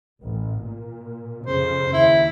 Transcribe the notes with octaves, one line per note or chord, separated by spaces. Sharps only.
A1
A#2
F2 C#3 C5
D#2 E4